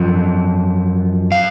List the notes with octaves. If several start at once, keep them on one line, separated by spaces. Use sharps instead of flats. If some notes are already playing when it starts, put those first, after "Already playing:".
Already playing: F#2 F3
F5